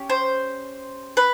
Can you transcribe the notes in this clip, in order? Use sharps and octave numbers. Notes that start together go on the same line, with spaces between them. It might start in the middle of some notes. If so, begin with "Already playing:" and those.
Already playing: C#4 G4
C5
B4